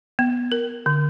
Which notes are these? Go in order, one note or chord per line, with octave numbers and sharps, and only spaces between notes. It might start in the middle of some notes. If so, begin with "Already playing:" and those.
B3
A#4
D3